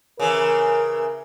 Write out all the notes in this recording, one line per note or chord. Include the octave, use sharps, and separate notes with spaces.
C#3 E3 A#4